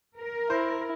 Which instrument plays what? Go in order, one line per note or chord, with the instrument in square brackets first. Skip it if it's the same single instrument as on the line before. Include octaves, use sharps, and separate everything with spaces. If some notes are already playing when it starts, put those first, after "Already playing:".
[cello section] A#4
[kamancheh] E4 [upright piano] C5